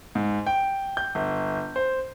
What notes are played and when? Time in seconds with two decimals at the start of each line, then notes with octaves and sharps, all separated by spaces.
0.15 G#2
0.47 G5
0.97 G6
1.15 G1
1.76 C5